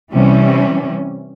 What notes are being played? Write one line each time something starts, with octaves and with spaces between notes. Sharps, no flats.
C3 E3 G3 C#4